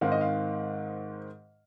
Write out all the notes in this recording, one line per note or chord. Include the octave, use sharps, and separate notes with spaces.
G#2 D#3 G#3 C4 F5
D#5
F5